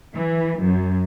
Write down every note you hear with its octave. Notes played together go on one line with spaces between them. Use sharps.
E3
F#2